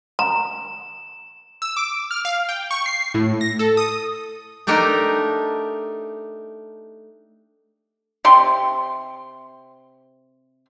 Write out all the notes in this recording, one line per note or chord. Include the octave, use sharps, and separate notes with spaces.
A#5 E7
E6
D6
F6
F5
G5
C#6
C7
A2
A#6
A4
D#6
A3 D4 D#4 G4 A#4
C3 C6